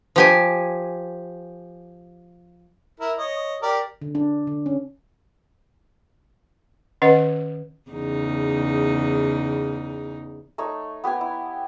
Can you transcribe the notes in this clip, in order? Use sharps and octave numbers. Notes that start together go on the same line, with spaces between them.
F3 G4 G#5
E4 A#4
C#5 D#5
G4 A#4 D5
D3
D4
D3
C#4
D#3 C#4 B4 D#5 F#5
E2 C#3 D#4
A3 D#4 C#5 C#6
B3 G4 F#5 G#5
E4